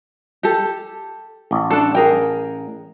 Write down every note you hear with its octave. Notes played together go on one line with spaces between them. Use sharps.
G4 A4
A1
D4 A4
G#4 A#4 G5